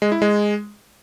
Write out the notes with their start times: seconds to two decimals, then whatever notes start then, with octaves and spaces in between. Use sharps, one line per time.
0.02 G#3
0.12 E4
0.22 G#3